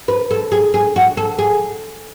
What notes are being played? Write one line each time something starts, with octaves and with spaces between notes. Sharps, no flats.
B4
A4
G#4
G#4
F#4
A4
G#4